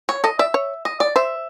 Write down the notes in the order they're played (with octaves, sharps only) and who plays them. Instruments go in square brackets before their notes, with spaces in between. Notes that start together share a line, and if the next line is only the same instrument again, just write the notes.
[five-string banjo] C#5
[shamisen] A4 [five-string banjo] D#5
[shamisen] D5 [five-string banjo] E5
[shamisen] C#5
[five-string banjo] D#5
D5
[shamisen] C5 [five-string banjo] E5